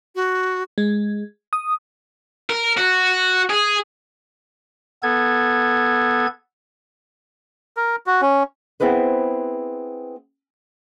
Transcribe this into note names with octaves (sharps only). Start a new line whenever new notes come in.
F#4
G#3
D#6
A#4
F#4
G#4
B3 A4 G#6
A#4
F#4
C#4
B3 C4 E4 G#4 B4 C5